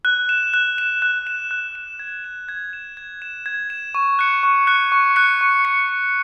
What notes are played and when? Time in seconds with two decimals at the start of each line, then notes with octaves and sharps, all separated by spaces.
0.05 F#6
0.29 E7
0.54 F#6
0.78 E7
1.02 F#6
1.27 E7
1.51 F#6
1.75 E7
1.99 G#6
2.24 E7
2.48 G#6
2.73 E7
2.97 G#6
3.22 E7
3.46 G#6
3.70 E7
3.95 C#6
4.19 F#6 C#7
4.43 C#6
4.67 F#6 C#7
4.92 C#6
5.16 F#6 C#7
5.41 C#6
5.65 C#7